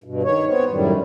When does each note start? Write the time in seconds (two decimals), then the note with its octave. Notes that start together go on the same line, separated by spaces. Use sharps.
0.04 G2 B2
0.23 D#3 C#5
0.46 B3 C4 C#5
0.69 F#2 A2 D#3 G3